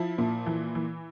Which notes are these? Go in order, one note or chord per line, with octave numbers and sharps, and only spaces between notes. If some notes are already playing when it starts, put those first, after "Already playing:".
Already playing: F3 E4
A#2
E3
E3